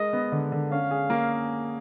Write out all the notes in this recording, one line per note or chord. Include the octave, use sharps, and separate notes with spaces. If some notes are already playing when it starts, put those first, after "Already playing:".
Already playing: G#3 A#4 D#5
B3
D3
D3
C#4 F5
G#4
A#3